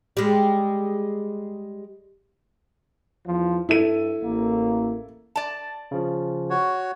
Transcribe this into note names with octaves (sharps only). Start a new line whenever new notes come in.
G3 G#3
E2 F3
G2 E4 A4 D#7
A1 A#3
D5 A5
C#3 F3
F#4 C#5